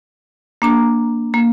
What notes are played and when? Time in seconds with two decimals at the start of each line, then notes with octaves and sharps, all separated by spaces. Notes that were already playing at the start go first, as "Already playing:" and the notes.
0.62 A#3 D4 A#5
1.34 A#3